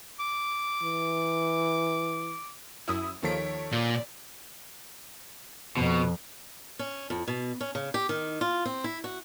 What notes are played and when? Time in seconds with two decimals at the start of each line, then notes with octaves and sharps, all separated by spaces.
0.19 D6
0.82 E3
2.88 F#2 E4 D#6 E6
3.23 D#2 D#3 F3 A4 C#5 B6 D7
3.72 A#2 D5
5.77 F2 B2
6.79 C#4
7.10 F2
7.28 B2
7.61 C#4
7.75 C#3
7.94 G4
8.09 D#3
8.41 F4
8.65 C4
8.84 E4
9.04 F#4